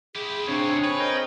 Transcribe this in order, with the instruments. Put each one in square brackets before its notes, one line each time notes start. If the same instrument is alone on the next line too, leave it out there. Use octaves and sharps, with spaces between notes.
[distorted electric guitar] E4 G4 [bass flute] G#4
[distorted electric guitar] D#2 C3 [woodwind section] C4 [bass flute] D4 [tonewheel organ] G#4 C#5
[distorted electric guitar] B4
[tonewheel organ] A#4 D#5 G5 [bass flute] C5